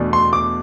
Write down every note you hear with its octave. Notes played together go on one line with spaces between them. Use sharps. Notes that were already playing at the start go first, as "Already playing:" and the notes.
Already playing: E2 B2 A3 D4
C6
D6